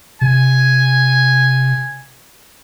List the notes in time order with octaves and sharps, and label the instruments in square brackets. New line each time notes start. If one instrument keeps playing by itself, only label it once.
[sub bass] C3 [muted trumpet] G#5